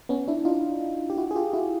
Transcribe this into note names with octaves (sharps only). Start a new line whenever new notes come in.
B3 C#4
D4 E4
D#4 F4
G4
E4 F#4
G#4
F4 G4
E4 F#4